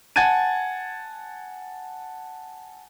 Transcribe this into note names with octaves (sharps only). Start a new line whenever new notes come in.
F#5 G#5 A5 G#6 A6 D#7